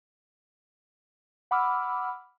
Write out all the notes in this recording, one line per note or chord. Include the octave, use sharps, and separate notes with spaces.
F#5 B5 D6 E6 F6